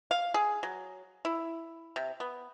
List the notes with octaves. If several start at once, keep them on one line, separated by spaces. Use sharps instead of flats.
F5
G#4
F#3
E4
C3
B3